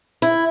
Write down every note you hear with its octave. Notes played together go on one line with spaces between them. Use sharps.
E4